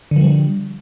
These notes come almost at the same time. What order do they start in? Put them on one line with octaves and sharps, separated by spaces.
D3 F3 G3